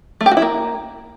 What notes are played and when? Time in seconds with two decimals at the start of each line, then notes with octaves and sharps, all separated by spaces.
0.21 A3
0.26 G4
0.31 F#4
0.37 E4
0.42 A#3